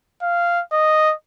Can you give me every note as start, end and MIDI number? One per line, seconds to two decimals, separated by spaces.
0.22 0.62 77
0.72 1.14 75